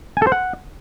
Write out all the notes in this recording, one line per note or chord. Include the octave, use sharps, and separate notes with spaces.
G#5
A4
C5
F#5